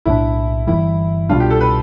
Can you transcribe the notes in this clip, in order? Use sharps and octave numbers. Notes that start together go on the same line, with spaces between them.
B1 A2 G3 D4 E4
G1 F2 E3 G3 E4
C2 B2 G3 D4 F4
G4
A4
B4